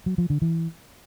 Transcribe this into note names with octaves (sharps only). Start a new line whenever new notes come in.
F#3
F3
D3
E3